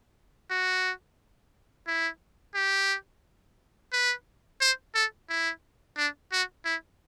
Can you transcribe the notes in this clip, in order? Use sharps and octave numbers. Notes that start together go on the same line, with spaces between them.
F#4
E4
G4
B4
C5
A4
E4
D4
F#4
E4